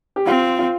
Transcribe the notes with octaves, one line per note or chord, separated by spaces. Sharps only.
G4
C4 F4
F4